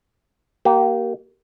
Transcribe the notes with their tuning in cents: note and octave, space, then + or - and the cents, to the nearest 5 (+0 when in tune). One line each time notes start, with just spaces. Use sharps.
A#3 +0 G4 -25